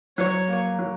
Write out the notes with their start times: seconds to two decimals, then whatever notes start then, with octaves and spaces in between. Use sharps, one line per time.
0.17 F#3 C#5
0.48 A#3
0.79 F#3